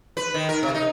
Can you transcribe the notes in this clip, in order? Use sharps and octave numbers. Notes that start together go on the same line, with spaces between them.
B4
D#3
A#4
C3
D#4